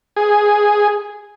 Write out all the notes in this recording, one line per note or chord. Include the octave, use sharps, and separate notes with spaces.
G#4